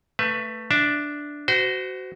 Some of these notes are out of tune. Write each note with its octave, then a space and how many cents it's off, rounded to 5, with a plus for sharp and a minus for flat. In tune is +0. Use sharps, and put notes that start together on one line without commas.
A3 +15 B4 +0 E5 +25
D4 +0 E5 +0
F#4 +15 C5 -30